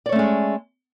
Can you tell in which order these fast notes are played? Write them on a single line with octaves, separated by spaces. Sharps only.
D5 C#5 A3 C#4 G#3